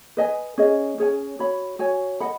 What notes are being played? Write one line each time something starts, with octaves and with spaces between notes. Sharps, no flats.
B4 D#5 G#5
C#4 G#4 D#5
C#4 G#4 C#5 G#5
F#4 C#5 B5
F#4 C#5 G#5
D#5 F#5 B5